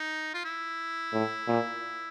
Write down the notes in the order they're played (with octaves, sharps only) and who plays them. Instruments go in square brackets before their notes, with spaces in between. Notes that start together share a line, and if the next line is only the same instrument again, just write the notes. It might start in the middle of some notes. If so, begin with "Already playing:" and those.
Already playing: [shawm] D#4
F4
E4
[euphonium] A2
A#2